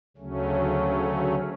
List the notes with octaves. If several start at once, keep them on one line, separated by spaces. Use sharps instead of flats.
D2 C#3 F#3 A3 C#4